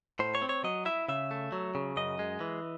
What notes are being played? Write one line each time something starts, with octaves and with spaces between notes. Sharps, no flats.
A2 C5
C#5
C4
C#5
F#3 D#5
E4 E5
C#3 E5
A3
F#3
C#3
F#2 D#5
G#3
E3